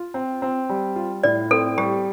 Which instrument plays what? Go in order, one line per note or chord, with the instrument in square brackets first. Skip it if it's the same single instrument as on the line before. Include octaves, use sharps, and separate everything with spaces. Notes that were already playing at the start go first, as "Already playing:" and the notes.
Already playing: [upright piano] F4
C4
C4
G3
F4
[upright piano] A2 [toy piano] D5
[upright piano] C4 [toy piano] A4
[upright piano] G3 [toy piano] G4